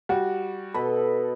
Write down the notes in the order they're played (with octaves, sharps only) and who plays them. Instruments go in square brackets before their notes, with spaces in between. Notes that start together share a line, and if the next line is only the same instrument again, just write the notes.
[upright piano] G3 F#4
[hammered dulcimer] B2 D#5 [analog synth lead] A4 [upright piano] B5